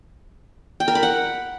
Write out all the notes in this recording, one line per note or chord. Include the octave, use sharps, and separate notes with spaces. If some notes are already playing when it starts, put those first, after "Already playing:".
G5
A#4
B5
F#5